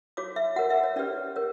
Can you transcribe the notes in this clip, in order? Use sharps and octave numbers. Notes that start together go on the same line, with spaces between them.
F#4 C#5 D6
E5
F#4 A#4 C#5 F#5
E5
C#5
C#4 G4 B4 D5
A#4 C#5